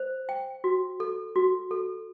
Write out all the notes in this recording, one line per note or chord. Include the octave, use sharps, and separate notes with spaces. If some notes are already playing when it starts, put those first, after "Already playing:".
Already playing: C5
G5
F#4
A4
F#4
A4